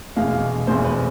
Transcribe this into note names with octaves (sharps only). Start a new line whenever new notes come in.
F1 E2 B2 G#3 F5
F1 E2 B2 G#3 C5
B4